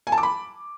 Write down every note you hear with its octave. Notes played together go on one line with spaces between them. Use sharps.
G#5
A5
D6
B5